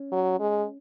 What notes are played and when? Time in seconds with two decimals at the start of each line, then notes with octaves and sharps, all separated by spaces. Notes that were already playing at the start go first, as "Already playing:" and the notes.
Already playing: C#4
0.12 F#3
0.40 G#3